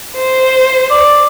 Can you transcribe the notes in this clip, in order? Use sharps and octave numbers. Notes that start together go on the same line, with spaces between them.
C5
D5